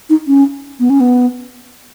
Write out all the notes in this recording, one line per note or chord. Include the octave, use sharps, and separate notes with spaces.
D#4
C#4
B3
C#4
B3